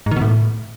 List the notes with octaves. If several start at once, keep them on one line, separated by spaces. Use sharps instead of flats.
G#2
D#3
B2
A2